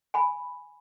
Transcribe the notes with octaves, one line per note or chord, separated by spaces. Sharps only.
G#5 B5